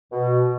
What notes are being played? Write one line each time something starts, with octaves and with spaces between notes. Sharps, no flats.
B2